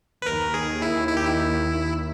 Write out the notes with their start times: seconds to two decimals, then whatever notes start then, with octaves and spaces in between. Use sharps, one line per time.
0.22 B4
0.26 D#2 D#3 A#4
0.54 G#4
0.82 E4
1.08 E4
1.17 G4
1.25 E4